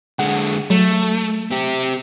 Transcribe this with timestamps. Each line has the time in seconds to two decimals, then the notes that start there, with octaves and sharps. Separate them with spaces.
0.19 D3 G#3 F#5
0.70 F#3 A3
1.51 C4 G4